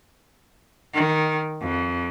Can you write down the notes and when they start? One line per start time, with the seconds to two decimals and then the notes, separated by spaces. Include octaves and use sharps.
0.94 D#3
1.61 F2